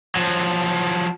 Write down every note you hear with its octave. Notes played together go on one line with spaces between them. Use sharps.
F3 F#3